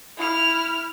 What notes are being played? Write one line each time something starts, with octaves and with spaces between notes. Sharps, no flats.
E4 F6